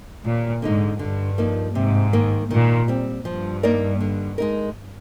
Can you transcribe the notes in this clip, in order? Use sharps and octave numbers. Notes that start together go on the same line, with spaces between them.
D#2 A#2
G#2 D3 G#3 D#4
G2 D3
F3 A#3 D#4
G#2 C3
D#3 A#3
A#2 D#3
G3 C4
G2 F3
A#3 D#4 A#4 D5
D3
G#3 D#4 A#4